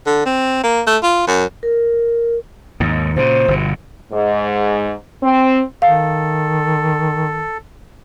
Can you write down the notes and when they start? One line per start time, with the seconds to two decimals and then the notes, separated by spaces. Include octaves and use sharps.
0.07 D3
0.26 C4
0.63 A#3
0.87 A3
1.03 F4
1.27 F#2
1.63 A#4
2.80 D#2 G#2
3.16 A#2 C#3 C5
3.48 G1 B2
4.12 G#2
5.23 C4
5.82 D#3 A4 F5